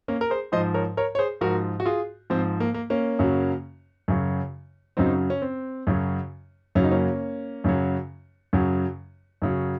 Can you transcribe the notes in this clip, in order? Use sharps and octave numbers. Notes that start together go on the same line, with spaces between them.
A#3 C#4
A#4
G#4 C5
G#2 F3 C5 D#5
A#4 C#5
A#4 C#5
C#5
G#4 C5
G#2 F3 F#4 A#4
F#4
F4 G#4
G#2 F3 C4
A#3
A#3
A#3 C#4
F#2 C#3 F#3
F#2 C#3 F#3
F#2 C#3 F#3 C4 D#4
C#4
C4
F#2 C#3 F#3
F#2 C#3 F#3 C#4
D#4
A#3 C#4
F#2 C#3 F#3
F#2 C#3 F#3
F#2 C#3 F#3